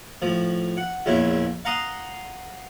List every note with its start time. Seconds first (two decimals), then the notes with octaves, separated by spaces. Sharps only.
0.22 A2 F3
0.77 F#5
1.06 A#1 E2 A#2 C#4 E4
1.65 F5 F#5 A#5 C6 D#6